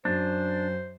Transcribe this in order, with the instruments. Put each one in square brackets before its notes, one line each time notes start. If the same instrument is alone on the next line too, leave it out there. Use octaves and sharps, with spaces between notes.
[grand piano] F#2 [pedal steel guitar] D4 [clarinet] C5